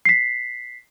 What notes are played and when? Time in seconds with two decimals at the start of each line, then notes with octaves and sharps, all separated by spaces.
0.05 B6 C7